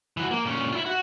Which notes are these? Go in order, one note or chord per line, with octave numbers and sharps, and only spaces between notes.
E3 F#4
A#3
A#2 C#4
E4 F4
F#4